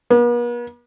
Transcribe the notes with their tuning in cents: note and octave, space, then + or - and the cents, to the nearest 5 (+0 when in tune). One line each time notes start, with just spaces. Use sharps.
B3 -45